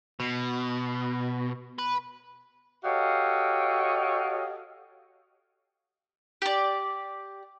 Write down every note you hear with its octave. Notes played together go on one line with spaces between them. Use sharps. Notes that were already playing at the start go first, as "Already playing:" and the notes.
B2
B4
F#4 G4 A4 C#5 D#5 F5
G4 D5